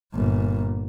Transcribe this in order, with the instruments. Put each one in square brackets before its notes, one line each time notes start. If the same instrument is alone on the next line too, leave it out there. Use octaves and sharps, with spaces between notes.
[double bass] G1 A#2